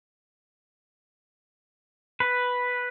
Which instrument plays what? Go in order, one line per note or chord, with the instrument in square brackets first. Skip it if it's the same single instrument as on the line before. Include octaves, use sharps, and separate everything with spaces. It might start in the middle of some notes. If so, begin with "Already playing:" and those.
[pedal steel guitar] B4